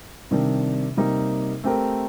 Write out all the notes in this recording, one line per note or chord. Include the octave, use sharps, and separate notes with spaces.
C3 D#3 G3 D4
C3 G3 A#3 D#4
A3 C4 G4 A#4